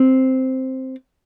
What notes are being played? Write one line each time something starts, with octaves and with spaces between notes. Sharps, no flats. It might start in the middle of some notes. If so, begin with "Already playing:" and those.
Already playing: C4